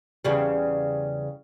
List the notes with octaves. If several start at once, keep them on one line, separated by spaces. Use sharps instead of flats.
E2 C#3 G3